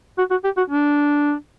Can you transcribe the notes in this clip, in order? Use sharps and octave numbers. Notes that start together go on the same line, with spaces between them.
F#4
F#4
G4
F#4
D4